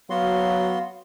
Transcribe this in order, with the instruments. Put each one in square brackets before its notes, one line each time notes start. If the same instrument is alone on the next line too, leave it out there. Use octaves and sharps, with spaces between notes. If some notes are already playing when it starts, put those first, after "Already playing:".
[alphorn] F#3 [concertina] B3 F#4 C6 [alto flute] F5